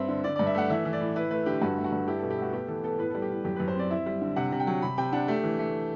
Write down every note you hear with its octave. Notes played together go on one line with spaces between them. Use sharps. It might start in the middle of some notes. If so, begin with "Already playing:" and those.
Already playing: G2 C4 E5
D3
D3 D5
G2 D5
E5
A3 F#5
E3 E5
E3
D5
A2
E4 B4
A3 B4
D3 G4
G2 F#4
A3
F#4
G2
E4 G4
B2 A4
G4
A3 F#4
B3 G4
E3 A4
B3 A4
A2 B4
G3 A4
G4
A2
F#2 G4
F#2 B4
C5
C4 D5
E4 E5
G3
D3
C3 F#5
C3
G5
F#3
C3 B5
C3 G5
D4 F#5
A3 G4
E3
A3